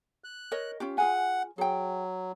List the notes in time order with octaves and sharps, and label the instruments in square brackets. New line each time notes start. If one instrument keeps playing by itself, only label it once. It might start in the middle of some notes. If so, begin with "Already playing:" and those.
[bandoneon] F#6
[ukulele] A#4 C#5 D#5
C#4 F4 G4
[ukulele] F4 G#4 G#5 [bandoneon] F#5
[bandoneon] F#3 [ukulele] G#4 G5